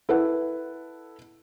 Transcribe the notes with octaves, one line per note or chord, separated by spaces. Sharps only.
E4 A4 B4 F#5